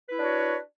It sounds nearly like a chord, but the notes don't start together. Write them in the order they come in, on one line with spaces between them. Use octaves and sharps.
B4 E4 D4 C#5 F#4